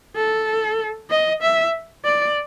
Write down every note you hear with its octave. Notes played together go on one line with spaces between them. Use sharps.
A4
D#5
E5
D5